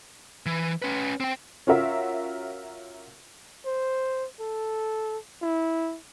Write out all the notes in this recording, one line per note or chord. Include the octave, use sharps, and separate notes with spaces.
E3
C#4 B4
C4 G5
C#4 F4 F#4 A#4 E5
C5
A4
E4